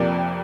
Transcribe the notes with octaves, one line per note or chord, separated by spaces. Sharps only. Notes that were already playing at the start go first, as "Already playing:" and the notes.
Already playing: F1 F2 C3 A#3 D5